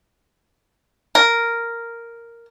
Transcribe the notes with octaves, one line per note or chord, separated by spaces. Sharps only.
A#4